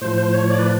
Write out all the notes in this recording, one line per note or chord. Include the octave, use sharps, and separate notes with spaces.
A2 F3 C5
C5
C#5
D5
B4